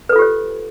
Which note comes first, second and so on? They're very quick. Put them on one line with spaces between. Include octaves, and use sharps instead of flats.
B4 A4 F4 G4 C5